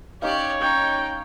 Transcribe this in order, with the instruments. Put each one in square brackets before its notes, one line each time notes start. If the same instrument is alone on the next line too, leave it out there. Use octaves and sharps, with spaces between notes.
[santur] C#4 D#4 F5 [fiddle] G4 D5 [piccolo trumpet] C#5
[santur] C#4 [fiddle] D#4 [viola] G5